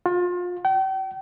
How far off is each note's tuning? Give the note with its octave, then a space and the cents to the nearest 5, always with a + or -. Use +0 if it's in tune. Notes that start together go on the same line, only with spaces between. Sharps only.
F4 +30
G5 -40